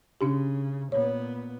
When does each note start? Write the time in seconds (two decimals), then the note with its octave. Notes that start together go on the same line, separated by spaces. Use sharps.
0.21 C#3 C#4 D4 G4
0.92 A#2 B3 C#5